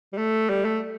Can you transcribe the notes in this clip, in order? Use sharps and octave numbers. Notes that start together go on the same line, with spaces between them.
G3
A3
G3
A3